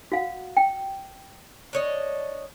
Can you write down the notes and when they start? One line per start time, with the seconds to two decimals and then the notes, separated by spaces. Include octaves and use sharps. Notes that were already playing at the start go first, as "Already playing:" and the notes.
0.12 F#4 F5 F#5
0.57 G5
1.73 D4 C#5 D#5